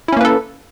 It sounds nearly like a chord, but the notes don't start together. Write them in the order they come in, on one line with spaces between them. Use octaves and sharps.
E4 C#4 A#3 B4 A4